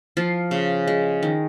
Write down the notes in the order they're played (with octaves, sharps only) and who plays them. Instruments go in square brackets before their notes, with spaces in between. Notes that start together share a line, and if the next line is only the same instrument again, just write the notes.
[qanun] F3 F4
C#3
G#3
D#3